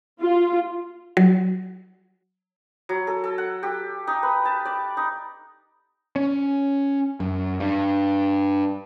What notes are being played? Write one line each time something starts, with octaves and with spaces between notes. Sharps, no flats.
F4
F#3
F#3
A4
A4
F#5
G4
D#4
B4
A5
D5
D#4
C#4
F#2
G2